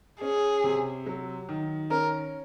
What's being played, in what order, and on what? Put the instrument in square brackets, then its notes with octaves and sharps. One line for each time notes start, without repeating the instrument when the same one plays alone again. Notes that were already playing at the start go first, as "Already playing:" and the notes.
[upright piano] C#4 [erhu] G#4
[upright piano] C3
F#3
D#3
[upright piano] C#4 [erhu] A#4